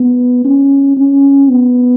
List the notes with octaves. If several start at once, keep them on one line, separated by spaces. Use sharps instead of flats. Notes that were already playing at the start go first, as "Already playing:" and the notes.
Already playing: B3
C#4
C#4
B3